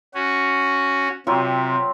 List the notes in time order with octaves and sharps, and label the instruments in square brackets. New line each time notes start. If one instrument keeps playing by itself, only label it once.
[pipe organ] C#4 F#4
[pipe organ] C3 [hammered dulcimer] F#3 F4 G4